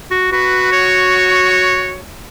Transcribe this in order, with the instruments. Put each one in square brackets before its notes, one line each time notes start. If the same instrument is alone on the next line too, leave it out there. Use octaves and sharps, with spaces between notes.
[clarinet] F#4
[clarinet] F#4 [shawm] B4
[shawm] C#5